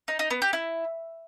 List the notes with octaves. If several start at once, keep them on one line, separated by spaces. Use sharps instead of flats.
D#4
D#4
B3
G4
E4